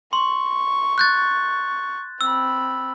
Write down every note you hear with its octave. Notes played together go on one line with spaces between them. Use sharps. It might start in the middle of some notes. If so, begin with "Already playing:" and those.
C6 C#6
F#6 G6 A6
C4 B5 E6